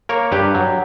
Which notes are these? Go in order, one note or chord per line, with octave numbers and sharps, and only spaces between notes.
A#3 A#4 C#5
G2 G4 B4
F#3